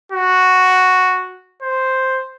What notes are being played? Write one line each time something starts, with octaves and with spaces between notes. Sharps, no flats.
F#4
C5